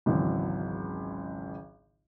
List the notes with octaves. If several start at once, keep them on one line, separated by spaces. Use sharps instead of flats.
G#1 C#2 E3 F#3